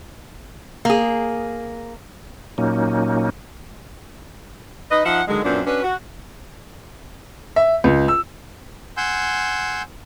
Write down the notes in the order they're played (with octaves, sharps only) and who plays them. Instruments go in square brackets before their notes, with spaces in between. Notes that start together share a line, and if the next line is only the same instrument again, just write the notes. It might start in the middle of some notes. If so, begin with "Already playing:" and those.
[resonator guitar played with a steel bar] A#3 G#4
[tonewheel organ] A#2 F#3 A#3 C#4 D#4
[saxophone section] D#4 B4 D#5
F3 D#4 E5 F#5
D3 D#3 F#3 G#3
F#2 A#2 B3 C4 D4
C#4 D4 F#4 B4
F#4
[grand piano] E5
C#2
E6
[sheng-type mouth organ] F#5 G#5 C6 E6 G6